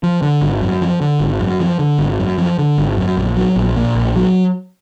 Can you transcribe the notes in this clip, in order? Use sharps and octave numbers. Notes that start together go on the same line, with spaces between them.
F3
D3
G#1
F#2
F3
D3
G#1
F#2
F3
D3
G#1
F#2
F3
D3
G#1
F#2
A#1
F#3
A#1
A#2
A#1
F#3